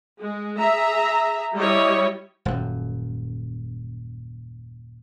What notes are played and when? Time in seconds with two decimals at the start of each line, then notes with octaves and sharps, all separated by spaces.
0.19 G#3
0.57 G#4 E5 A#5
1.54 G3 E4 G4 C#5 D#5
2.45 D#1 F#2